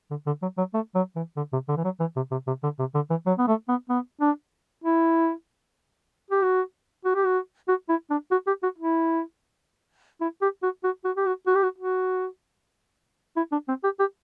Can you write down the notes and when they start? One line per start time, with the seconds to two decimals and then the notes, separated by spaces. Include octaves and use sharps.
0.10 D3
0.26 D3
0.42 F#3
0.58 F#3
0.74 A3
0.95 F#3
1.16 E3
1.37 D3
1.53 C3
1.68 D3
1.77 E3
1.84 F#3
2.00 E3
2.16 C3
2.31 C3
2.47 C3
2.63 D3
2.79 C3
2.95 D3
3.10 E3
3.26 F#3
3.38 B3
3.48 A3
3.69 B3
3.89 B3
4.21 D4
4.84 E4
6.30 G4
6.42 F#4
7.05 F#4
7.15 G4
7.26 F#4
7.68 F#4
7.89 E4
8.10 D4
8.31 F#4
8.47 G4
8.63 F#4
8.78 E4
10.21 E4
10.41 G4
10.63 F#4
10.84 F#4
11.05 F#4
11.17 G4
11.26 F#4
11.47 F#4
11.55 G4
11.63 F#4
11.78 F#4
13.36 E4
13.52 D4
13.68 C4
13.84 G4
13.99 G4